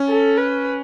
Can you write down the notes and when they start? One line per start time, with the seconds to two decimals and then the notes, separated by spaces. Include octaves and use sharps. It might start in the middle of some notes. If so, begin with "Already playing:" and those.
Already playing: C#4
0.08 A4
0.38 B4